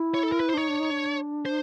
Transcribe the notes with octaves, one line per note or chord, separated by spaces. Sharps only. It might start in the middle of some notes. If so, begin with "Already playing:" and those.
Already playing: E4
C#5
A4
A#4
B4
C5
D4
D#4 C#5
D4
D#4
D4
C5